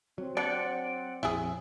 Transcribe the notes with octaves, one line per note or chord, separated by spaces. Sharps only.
F#3 C4
D4 D5 F#5 G5
A#1 F2 E4 G#4